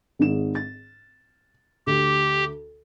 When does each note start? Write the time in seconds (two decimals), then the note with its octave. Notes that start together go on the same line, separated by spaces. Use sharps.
0.19 G#1 G#2 E7
0.55 A6
1.87 D2 G4